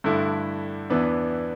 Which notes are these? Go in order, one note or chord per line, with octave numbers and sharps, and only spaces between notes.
G2 D3 A3 E4
E2 E3 B3 D4